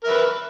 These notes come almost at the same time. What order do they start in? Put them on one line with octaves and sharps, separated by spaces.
A#4 E5 B4